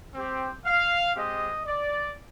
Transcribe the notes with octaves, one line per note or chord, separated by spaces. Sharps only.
C4 G4
F5
G#3 C4 G4 D#5
D5